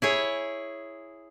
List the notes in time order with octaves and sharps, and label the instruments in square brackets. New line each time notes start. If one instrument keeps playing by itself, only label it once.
[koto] E4 G#4 C#5